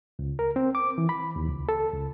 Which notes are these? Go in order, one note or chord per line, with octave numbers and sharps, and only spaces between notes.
C#2
A#4
C4
D6
E3
B5
D#2
C#2
A4
C#2